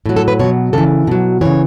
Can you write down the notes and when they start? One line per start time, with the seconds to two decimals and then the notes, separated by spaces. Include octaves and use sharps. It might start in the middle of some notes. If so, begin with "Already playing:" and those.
0.06 A2 F#3
0.16 A4
0.28 B4
0.39 B2 F#3 C#5
0.73 C#3 E3 A4
1.07 B2 F#3
1.41 C#3 E3 C#5